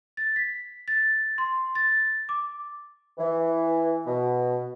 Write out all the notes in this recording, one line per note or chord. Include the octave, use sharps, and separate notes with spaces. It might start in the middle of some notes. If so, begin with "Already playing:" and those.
A6
B6
A6
C6
A6
D6
E3
B2